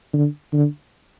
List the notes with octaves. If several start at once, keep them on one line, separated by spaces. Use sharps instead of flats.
D3
D3